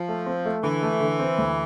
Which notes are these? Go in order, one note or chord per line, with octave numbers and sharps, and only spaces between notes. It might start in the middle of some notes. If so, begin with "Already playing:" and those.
Already playing: F3
A3
C4
A3
D3 E3
A3
D3
C4
D2